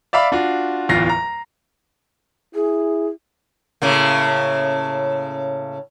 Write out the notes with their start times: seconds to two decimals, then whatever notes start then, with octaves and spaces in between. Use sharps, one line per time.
0.13 D5 E5 F5 B5 D6
0.32 D4 F4 F#4
0.89 D1 E2 F4 A#6 C7
1.09 A#5
2.55 E4 G#4
3.82 A2 C#3 A#3